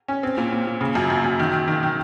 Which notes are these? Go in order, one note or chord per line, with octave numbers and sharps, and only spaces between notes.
C#4
C4
A#2
A#2
A#2
C#3
F#2
F#2
F#2
D#3
D#3
D#3
D#3